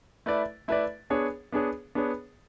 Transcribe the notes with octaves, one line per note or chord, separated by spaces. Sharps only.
A3 E4 B4 D5
A3 E4 B4 D5
B3 D4 G#4 C#5
B3 D4 G#4 C#5
B3 D4 G#4 C#5